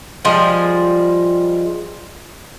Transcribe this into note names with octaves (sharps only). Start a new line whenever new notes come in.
F3 G3 G#3